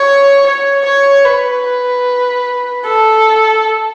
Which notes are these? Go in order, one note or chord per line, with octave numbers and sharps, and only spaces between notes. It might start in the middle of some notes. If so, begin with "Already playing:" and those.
Already playing: C#5
C#5
C#5
B4
A4